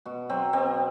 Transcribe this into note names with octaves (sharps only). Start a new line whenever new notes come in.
B2 F#4
F#3 C4
B2 C4